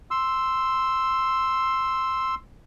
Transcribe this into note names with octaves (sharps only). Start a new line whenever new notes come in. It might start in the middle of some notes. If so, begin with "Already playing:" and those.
C6 E6